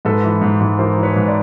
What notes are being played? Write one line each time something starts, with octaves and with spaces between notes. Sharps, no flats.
G#2 A4 B4
E3
G#2
G#2
E3 A#4 C5
E3
B4 C#5
G#2
D5